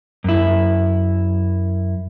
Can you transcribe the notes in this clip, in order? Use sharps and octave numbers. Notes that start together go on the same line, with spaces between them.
F#2 E4